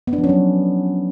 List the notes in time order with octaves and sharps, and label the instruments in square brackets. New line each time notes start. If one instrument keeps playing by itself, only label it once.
[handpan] B3
D4
F3
C#4
F#3